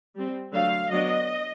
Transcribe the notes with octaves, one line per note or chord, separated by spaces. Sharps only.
G3 C4
D3 F#3 A3 F5
F#3 B3 D4 D#5